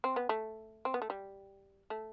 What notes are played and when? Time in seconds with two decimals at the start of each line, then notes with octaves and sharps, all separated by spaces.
0.04 C4
0.16 B3
0.29 A3
0.85 C4
0.94 B3
1.02 A3
1.10 G3
1.90 A3